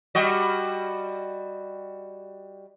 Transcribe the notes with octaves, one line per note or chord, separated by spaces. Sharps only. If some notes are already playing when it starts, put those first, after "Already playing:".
G3 F#4 D#5